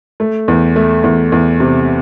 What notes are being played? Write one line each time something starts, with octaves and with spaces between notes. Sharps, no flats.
A3
E2
A3
E2
E2
C3